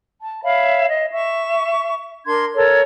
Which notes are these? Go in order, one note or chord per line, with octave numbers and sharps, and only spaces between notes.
A5
C#5 E5 F5 B5
D#5
E5 C#6
D4 A#4 C6 G#6
A4 A#4 C#5